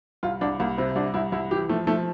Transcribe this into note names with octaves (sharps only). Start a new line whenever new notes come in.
C2 F4
C2 D4
C2 A#3
C3 C4
C2 D4
C2 E4
C2 E4
E3 G4
F3 A3
F3 A3